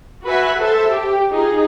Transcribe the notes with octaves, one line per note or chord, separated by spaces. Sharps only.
F#4 B4 E5 F#5 G#5
A4 C5 E5 A5
G4
D#4 F4 G#4